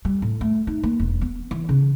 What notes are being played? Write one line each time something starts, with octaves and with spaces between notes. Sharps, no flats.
G3
A2
A3
D#4
A#3
E1
B3
E3
C#3